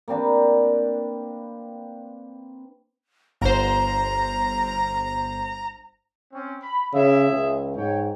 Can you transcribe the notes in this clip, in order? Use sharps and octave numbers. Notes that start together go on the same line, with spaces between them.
A#3 C4 D4 B4
G1 C5 A#5
C4 C#4
B5
C#3 G#4 E5
C#2
G#2 C#5 G5